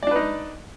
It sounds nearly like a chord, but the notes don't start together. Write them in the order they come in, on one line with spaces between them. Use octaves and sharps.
D5 D4 B4 D#4